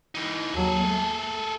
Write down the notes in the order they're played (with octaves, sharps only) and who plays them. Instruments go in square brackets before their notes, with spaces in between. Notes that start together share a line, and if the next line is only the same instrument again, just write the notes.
[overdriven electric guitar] E3 D#4
[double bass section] D#2 F#3 [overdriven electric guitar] G#4 A4
[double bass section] A3